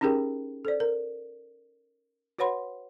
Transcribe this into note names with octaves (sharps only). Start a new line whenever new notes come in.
C#4 D#4 G4 G#4 A#4 G5
A4 C5 D5
A#4
F#4 B4 C#5 F#5 B5 C6